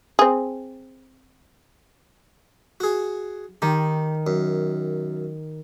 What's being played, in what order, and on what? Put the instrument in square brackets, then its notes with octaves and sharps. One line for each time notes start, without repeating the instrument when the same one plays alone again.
[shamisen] C4 G#4
[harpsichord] F#4 G#4
[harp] D#3 [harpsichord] G4
[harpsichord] F#2